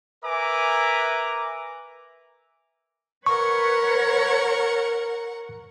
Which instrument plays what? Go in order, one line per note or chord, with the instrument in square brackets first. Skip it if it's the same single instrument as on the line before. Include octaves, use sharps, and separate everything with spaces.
[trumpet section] A#4 B4 E5 G#5 A#5 D6
[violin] A#4 F#5 [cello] B4 C#5 [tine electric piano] C#6